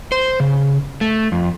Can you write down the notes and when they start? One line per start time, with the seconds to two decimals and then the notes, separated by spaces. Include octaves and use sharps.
0.12 C5
0.40 C#3
1.01 A3
1.32 F2